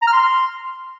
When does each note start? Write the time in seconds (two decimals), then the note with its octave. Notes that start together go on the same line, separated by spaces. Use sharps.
0.02 A#5
0.07 F6
0.13 C6